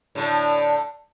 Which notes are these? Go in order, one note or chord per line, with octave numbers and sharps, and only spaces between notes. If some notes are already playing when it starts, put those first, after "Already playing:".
A2 D3 A3